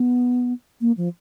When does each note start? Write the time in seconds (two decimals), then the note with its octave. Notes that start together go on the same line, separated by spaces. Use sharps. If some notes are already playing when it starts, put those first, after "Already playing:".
Already playing: B3
0.81 A#3
0.97 F3